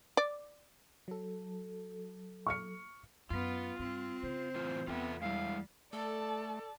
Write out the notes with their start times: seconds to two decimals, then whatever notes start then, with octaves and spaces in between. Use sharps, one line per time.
0.17 D5
1.08 F#3 A4
2.47 C#6 F6 C#7
3.30 F#2 B3 F4
3.79 G2 C4
4.23 C#3 C5
4.55 A2 E3 F4
4.87 E2 B3 C4 F4 A4 E5
5.22 G3 G#3 E4 F5
5.93 A3 A4 D5 A5